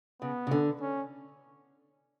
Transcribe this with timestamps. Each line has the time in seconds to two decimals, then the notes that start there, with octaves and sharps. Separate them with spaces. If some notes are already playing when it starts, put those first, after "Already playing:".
0.21 C#3 B3
0.47 C#3
0.51 D3
0.81 C#4